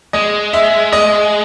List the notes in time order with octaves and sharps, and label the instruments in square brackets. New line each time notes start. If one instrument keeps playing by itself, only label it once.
[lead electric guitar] G#3 [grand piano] D#5
[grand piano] E5
D#5